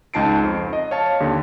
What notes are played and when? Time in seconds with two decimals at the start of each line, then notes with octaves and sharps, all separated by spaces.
0.14 C#2 D#4 A5 C7 D7
0.43 F2
0.73 D#5
0.91 C#5 F5 A5
1.20 D#2 D3